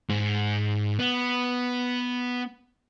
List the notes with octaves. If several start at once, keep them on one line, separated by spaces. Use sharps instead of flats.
G#2
B3